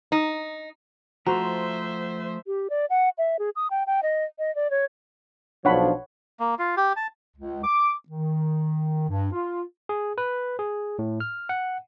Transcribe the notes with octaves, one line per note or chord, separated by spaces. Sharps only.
D#4
F3 A3 F#4 C5 E5 A#5
G4
D5
F#5
E5
G#4
D#6
G5
G5
D#5
D#5
D5
C#5
B1 F3 D4 C#5 F#5 B5
A#3
F4
G4
A5
C#2
D6
D#3
G2
F4
G#4
B4
G#4
A2
F6
F#5